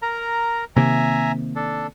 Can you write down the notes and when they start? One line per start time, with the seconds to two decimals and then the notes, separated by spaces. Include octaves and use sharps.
0.02 A#4 A#5
0.76 C3 D#3 A#3 E5 G#5 A#5
1.56 D4 A4